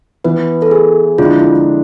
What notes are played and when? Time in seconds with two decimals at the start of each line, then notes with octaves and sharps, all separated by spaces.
0.24 E3 B3 E4 B4
0.62 A4
0.71 G#4
1.18 F2 D3 G#3 D4 F4
1.25 E4
1.39 E4